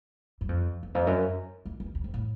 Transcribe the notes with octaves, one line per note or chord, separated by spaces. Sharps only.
F#2
F2
E2
F2
F#2
F2
E2
E2
F2
A2